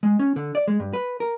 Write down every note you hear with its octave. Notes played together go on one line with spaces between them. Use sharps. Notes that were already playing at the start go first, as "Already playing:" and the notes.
G#3
C#4
D3
D5
G#3
G2
B4
A#4